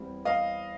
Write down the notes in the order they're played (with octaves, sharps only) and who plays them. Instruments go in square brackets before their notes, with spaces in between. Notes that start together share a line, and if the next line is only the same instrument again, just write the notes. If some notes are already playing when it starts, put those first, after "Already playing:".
Already playing: [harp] E2 G3 C4 E4
[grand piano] D#5 F5